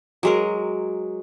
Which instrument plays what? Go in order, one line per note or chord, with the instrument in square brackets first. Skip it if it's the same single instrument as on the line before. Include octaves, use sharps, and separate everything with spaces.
[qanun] F#3 G#3 A#4